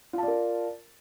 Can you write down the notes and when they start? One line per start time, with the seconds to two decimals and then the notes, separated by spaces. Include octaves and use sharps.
0.13 F4
0.18 A5
0.23 D5
0.28 A#4